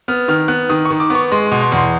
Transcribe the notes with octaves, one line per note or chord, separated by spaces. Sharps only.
B3 F6
D#3 F6
B3 F#6
D#3 D#6
C#6
D#3
D6
B3
C#6
G#3 C6
C6
B2
C6
E2
C6